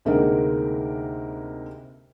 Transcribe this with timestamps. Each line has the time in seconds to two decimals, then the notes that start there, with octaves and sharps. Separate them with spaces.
0.05 D2 C3 G#3 A#3 D#4 A#4